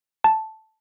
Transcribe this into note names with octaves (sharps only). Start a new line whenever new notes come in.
A5